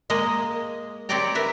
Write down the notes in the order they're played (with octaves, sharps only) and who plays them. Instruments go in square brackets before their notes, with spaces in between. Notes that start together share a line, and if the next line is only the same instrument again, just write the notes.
[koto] G#3 A#3 G#4 D#5
C4 G4 C#5 D5 G5 A#5
A#4 B4 E5